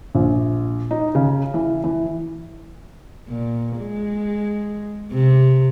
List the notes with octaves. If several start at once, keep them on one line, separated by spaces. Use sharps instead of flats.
A#1
D#4
C#3
E3
E3
A#2
G#3
C3